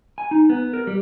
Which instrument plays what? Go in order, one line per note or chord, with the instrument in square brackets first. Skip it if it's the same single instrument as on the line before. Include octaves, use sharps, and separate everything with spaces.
[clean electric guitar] G#5
D#4
B3
A#4
G3